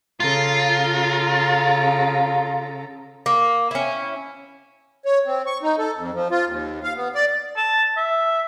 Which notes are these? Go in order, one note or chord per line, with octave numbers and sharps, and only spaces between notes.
C#3 F4 A4 A#5
A#3
C#4 E4
C#5
C4
C#6
D#4
A4
F2
F3
F4
D#2
F5
B3
D5
A5
E5